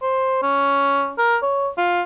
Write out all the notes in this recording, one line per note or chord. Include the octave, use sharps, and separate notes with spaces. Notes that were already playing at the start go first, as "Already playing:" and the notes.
C5
C#4
A#4
C#5
F4